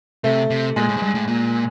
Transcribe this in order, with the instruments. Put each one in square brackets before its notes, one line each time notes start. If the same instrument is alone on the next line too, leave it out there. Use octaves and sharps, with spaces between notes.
[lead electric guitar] C3 [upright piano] A3
[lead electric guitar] C3
[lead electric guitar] A#2 [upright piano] G#3
[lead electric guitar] A2
G#2
G2
A2
A#2